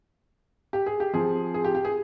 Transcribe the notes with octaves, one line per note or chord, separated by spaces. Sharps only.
G4
G#4
G4
F3 C4 G#4
G#4
G4
G4
G#4